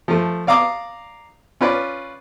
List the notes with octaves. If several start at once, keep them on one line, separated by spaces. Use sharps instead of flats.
F3 A3
D5 F5 A#5 D6 D#6
C#4 F4 B4 D5